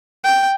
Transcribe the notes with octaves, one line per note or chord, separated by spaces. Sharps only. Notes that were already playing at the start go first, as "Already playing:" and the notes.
G5